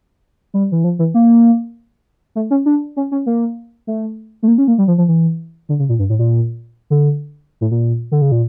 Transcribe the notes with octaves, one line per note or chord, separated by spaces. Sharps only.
G3
E3
F3
E3
A#3
A3
C#4
D4
C#4
C#4
A#3
A3
A3
A#3
C#4
A#3
G3
F3
F3
E3
D3
C#3
A#2
G2
A2
A#2
D3
A2
A#2
D3
C#3
A#2